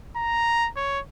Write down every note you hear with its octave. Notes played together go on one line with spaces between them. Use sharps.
A#5
C#5